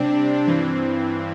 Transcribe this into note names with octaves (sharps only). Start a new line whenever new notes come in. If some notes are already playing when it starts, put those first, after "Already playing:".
Already playing: C3 G3 C4 D4
G2 E3 C4